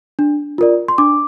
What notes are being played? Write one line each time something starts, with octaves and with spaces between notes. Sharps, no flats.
D4
F4 A#4 D5
C6
D4 D6